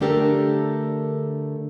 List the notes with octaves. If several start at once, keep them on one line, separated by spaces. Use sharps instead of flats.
D3 A3 D4 G4 A4 A#4